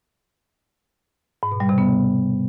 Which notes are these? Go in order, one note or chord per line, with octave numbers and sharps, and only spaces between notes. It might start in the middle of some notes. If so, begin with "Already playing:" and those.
G#2
B2
G3
C3
B3